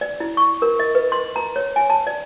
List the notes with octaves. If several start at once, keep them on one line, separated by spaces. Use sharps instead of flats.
D5
E4
C#6
A#4
D#5
B4
C6
A#5
C#5
G#5
A5
D5